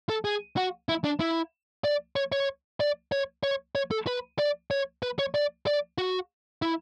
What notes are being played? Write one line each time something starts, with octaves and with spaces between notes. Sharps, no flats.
A4
G#4
F#4
E4
D4
E4
D5
C#5
C#5
D5
C#5
C#5
C#5
A4
B4
D5
C#5
B4
C#5
D5
D5
F#4
E4